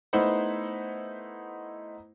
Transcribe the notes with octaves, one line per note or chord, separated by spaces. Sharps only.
A3 B3 D#4 E4 C5 F#5